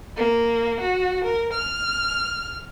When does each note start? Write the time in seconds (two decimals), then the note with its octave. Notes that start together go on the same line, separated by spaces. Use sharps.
0.17 A#3
0.81 F#4
1.25 A#4
1.54 F6